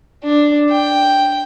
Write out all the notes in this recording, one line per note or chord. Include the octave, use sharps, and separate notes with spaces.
D4
G5